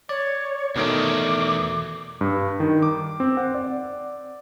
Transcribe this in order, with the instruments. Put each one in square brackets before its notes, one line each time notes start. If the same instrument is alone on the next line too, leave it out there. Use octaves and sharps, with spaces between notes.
[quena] C#5 [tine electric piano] D5
[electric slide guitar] E2 A#4 D5 [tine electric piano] B2 D#3 A3 [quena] D6
[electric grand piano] G2
D#3
D6
C4
F#5
D5